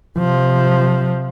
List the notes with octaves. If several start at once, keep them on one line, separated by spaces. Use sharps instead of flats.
C3 F3